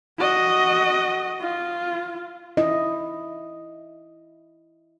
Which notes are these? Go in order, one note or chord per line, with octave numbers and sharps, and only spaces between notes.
F#4 D#5
F4
E4 D#5